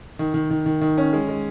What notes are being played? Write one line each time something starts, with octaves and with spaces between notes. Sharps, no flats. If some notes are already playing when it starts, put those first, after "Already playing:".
D#3
D#3
D#3
D#3
D#3
C#4
G#3
G#3